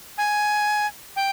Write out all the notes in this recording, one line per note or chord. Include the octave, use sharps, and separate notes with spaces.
G#5
G5